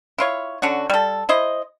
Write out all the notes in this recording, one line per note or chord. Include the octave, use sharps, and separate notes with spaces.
E4 F4 C#5
D3 C#4 F#4
G3 A4
E4 C5 D#5